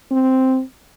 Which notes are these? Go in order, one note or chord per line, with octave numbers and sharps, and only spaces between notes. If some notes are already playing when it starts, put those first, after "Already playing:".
C4